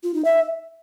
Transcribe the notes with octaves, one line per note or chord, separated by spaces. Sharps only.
F4
D#4
E5